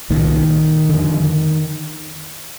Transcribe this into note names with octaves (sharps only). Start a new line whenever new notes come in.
C2 A#2 D#3
F2 D3